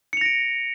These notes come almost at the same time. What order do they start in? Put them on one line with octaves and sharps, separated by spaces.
C#7 F7 A#6 D7